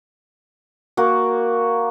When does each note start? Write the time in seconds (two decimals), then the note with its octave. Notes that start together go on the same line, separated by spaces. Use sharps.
0.97 A#3 F#4